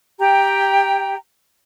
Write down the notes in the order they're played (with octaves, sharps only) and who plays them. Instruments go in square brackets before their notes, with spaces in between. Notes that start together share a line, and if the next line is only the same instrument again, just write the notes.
[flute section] G4 G5 A#5